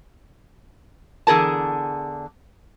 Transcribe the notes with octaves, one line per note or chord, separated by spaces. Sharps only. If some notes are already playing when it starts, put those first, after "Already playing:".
E2 D3 G#4 A#4 A5